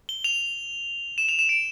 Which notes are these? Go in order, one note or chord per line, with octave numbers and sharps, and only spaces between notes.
G7
F7
E7
F7
E7
D7